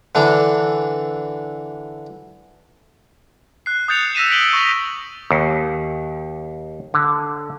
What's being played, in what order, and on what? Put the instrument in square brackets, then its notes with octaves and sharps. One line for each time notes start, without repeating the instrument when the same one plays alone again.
[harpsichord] D3 E3 D4
[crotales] F#6 C7
D#6 F#6 G6 A6 C#7 F7
E6 A#6 B6 D#7 E7
B6 D7 F#7 G7
C#6 D#6 A#6
[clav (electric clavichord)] D#2
D3